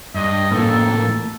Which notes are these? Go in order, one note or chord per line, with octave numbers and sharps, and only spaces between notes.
G2 D#5
A2 F3 A#3 A4